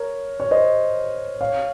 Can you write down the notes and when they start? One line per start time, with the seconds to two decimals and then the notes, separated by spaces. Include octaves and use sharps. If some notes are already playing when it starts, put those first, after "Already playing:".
Already playing: A#4 C#5
0.40 C#5
0.51 C5 D#5
1.41 C#5 F5